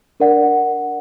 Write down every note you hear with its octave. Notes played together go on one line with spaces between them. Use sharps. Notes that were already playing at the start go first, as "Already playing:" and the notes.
D4 A#4 D5 F#5